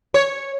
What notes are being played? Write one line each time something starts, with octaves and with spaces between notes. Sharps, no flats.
C#5